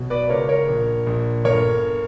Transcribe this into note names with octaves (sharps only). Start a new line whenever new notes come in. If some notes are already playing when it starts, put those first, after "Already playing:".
Already playing: B1 B2
B4 D5
C#2 A#4 C#5
A#4 C#5
A#1
A#1
G1 A#4 C#5